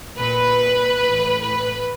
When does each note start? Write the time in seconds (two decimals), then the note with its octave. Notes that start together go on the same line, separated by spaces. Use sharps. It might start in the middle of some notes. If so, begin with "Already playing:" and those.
0.18 A#2 B4
1.01 A2 E3
1.41 B4